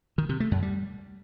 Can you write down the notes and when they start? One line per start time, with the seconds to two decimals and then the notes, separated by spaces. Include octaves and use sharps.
0.18 D#3
0.29 C3
0.40 A3
0.51 F#2
0.62 G3